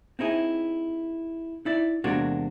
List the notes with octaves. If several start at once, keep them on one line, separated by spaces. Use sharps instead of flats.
C4 D#4 E4 G#4
D#4 E4 D5
E2 C3 G#3 A#3 D4 F#4